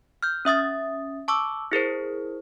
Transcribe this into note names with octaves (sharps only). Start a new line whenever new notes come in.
F6 G6
C#4 E5 D#6 A6
A5 C#6 D6 E6
E4 G#4 A#4 C5